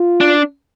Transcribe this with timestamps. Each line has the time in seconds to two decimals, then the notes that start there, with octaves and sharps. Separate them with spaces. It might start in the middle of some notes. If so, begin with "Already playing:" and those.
Already playing: F4
0.21 D4